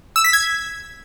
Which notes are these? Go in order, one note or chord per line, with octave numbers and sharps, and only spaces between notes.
E6
B6
G#6